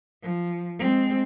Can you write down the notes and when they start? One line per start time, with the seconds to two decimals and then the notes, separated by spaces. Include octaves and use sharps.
0.23 F3
0.79 G#3 C4